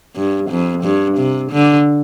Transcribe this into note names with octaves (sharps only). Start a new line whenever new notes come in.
G2
F2
G2
C3
D3